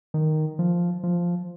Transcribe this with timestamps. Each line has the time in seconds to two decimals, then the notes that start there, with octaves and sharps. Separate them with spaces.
0.14 D#3
0.59 F3
1.03 F3